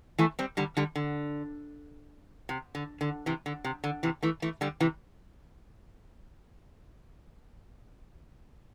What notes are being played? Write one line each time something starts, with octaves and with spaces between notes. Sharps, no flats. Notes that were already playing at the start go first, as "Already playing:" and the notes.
E3 A3
G3 C4
D3 G3
D3 G3
D3
C3
D3
D3
C3 E3
D3
C3
D3
C3 E3
E3 A3
E3 A3
D3 G3
C3 E3